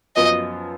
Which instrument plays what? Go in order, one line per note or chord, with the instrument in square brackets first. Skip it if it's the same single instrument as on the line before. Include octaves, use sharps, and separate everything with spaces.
[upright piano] F#2 F3 B3 F4 [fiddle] D#5